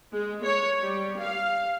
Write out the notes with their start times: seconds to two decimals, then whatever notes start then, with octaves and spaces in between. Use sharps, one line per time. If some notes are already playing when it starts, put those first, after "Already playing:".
0.13 G#3
0.44 C#5
0.82 G3
1.21 F5